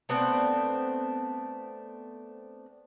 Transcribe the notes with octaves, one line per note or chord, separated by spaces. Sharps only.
A3 B3 C4 D4